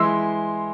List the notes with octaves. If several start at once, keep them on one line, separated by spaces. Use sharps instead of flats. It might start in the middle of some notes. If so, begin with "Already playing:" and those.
Already playing: E3 G#3 E4 C6 E6